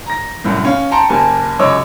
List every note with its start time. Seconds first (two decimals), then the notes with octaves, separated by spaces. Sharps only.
0.06 A#5 A#6
0.44 C2 F#2 A2
0.65 C#4 F5
0.91 G5 A5 A#5 C6 C#7
1.10 F#1 A#3 G4 G#5 A5
1.59 C#2 F#2 C#5 D#5 D6 E6